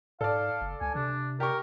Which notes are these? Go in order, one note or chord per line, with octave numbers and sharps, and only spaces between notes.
G#2 A4 D5 F5
F#1
C#2 G#5
C3 D4
G4 A#4 A#5 C#6